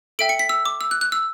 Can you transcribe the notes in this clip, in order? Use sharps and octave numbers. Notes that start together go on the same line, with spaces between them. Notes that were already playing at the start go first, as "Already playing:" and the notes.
A4 E5 G5 D7
C#7
B6
E6
D6
E6
F#6
F#6
E6